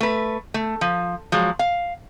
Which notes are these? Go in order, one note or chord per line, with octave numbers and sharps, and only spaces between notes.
A3 B4
A3
F3
F3 F#3 G#3
F5